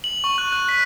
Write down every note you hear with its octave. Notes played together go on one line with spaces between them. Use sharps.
F#7
C#6
F#6
F#6
B6